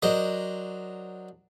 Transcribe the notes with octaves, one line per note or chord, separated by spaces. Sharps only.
F#3 D4 A#4 C5 D#5